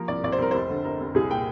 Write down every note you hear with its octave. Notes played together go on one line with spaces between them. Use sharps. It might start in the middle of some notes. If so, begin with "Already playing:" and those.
Already playing: F3 A#3 A#4
C2 D5
C2 D5
C5
C2 A#4
F1 C5
D3
F1 A#4
F1
C2 G#4
A#2 G5